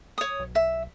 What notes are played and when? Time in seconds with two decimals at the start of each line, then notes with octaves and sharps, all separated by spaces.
0.18 C#5 D#6
0.39 B1
0.55 E5